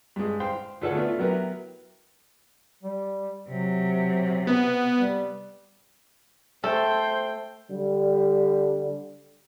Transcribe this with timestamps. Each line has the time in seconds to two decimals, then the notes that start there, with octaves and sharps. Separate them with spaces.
0.16 G2 G#3
0.40 C5 F5 G5 C6
0.81 D2 F4 A4 C#5 F#5
0.95 A3 B3 D4 F4
1.19 F#3 B3 E4 G4 A#4 B4
2.83 G3
3.49 C3 F#3
4.47 B3
5.00 G3
6.64 A3 A4 C5 G5
7.70 D3 G3